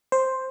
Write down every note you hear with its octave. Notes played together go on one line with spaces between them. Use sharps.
C5